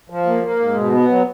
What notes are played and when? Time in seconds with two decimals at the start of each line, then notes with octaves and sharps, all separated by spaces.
0.10 F3
0.26 A#3
0.43 A#3
0.60 G#2
0.75 B2
0.92 B3
1.09 F#3